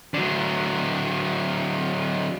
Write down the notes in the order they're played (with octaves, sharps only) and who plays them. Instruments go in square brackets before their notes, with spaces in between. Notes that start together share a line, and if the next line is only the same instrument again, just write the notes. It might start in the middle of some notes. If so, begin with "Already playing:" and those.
[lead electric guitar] D3 F#3